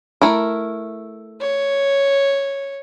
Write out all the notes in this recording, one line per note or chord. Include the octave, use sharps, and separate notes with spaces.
A3 E4 A#4
C#5